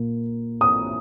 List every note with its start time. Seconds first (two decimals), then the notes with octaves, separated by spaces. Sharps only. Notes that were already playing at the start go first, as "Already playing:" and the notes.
Already playing: A#2 A#3
0.61 D#6